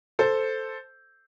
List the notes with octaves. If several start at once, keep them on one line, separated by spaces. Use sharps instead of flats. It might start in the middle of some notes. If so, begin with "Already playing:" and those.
A4 C5